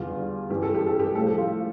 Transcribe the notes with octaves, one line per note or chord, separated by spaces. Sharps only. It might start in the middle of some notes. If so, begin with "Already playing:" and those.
Already playing: E2 D3 G3 F4
G2 E3 G3 G4
A4
G4
A4
G4
A2 F3 A3 A4
G4
F4